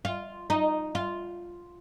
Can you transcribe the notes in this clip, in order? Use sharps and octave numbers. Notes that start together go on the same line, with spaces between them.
F4
D#4
F4